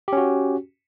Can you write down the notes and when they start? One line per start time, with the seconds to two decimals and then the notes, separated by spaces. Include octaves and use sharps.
0.08 G4
0.13 C#4
0.17 F#4